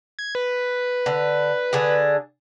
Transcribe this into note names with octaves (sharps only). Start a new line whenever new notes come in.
G#6
B4
D3
D3 D4 G#4